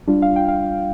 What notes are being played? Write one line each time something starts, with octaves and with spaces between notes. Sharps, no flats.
G3 D4 F4
F5
G5
F5